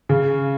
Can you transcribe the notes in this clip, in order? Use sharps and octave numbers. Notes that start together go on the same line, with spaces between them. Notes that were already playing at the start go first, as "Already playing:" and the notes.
C#3